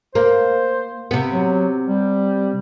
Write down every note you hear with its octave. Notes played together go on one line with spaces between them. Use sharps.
A#3 C5
C3 B3
F#3
G3